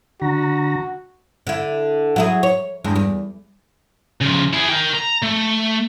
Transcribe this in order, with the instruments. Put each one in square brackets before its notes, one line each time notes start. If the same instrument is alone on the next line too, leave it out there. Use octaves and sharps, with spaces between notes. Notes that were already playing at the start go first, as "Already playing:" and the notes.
[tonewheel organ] D3 A#5 [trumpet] F#4
[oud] D3 E4
F#3 E4 G#4
C#5
E2 G2 G#3
E2
[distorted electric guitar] C#3 F3
E4 G#4
A#4 G5
A#5
A3